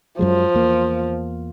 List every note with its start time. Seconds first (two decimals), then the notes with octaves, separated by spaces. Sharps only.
0.19 F#2 F3 F#3 G#3
0.54 E2 A#3